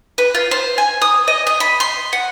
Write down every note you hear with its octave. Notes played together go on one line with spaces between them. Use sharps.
B4
F4
C5
G#5
D#6
D#5
D#5
B5
C6
F#5